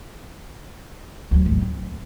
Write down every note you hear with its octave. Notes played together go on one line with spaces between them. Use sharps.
D2 F#3
A1 D#2
C4